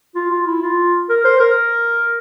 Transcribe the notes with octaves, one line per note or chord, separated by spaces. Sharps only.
F4
F4
E4
F4
A#4
C5
A#4